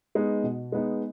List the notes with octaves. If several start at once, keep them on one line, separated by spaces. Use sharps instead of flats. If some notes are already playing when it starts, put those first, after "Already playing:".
G#3 B3 D#4
B2
G#3 B3 D#4